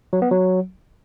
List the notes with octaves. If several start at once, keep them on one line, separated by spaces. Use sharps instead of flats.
F#3
B3
F#3